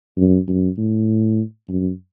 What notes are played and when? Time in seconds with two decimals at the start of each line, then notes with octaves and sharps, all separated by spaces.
0.17 F#2
0.48 F#2
0.77 A2
1.69 F#2